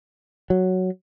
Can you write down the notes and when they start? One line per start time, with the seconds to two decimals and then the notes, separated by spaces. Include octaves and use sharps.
0.50 F#3